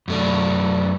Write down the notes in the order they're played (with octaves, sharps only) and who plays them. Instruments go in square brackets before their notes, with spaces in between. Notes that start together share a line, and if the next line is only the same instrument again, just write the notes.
[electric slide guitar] F#2 A3 D4